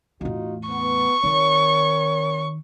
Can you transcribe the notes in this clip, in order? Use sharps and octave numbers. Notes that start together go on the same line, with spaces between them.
E2 A2 D#4 F4 F#4
B3 C#6
D#3 C4 A#4 C#5